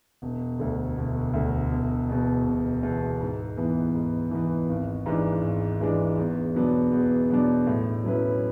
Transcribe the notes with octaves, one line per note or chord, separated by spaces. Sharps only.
E1
D2 D3
E1
D2 D3
E1
E2 B2
E1
E2 B2
G#2
E3 B3
G#2
E3 B3
G#1
G#2 E3 G#3 D4
G#1
G#2 E3 G#3 D4
E2
B2 F#3 B3 D4
E2
B2 F#3 B3 D4
A2
F#3 C#4 E4 B4